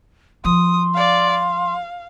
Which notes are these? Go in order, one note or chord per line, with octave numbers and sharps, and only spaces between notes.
F3 C6 D#6
D5 F5
F5